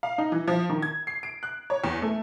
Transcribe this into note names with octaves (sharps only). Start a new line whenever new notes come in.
F5
D#4
E3
F3
D#3
G#6
C7
D7
F#6
C#5
E2
A3